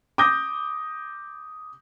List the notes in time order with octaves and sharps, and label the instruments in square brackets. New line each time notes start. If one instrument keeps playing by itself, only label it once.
[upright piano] D6 D#6 G6 A#6